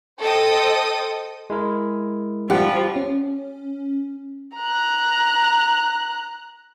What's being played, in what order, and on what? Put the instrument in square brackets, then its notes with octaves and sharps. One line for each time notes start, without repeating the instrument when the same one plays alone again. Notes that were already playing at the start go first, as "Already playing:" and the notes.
[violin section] A4 C5 D#5 G5 D#6
[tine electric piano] G#3 E4 A#4
[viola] F3 [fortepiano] G3 F#5 [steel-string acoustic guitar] G4
[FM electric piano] C#4
[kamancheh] A#5 F#6